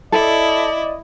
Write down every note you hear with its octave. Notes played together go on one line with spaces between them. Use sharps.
E4 A4 D5 D#5